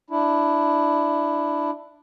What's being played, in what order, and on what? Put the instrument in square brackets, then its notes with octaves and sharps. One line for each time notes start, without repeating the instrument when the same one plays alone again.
[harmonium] D4 E4